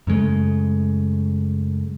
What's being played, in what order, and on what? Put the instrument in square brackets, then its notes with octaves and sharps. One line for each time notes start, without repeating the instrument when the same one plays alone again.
[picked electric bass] F#2 C#3 G#3 A3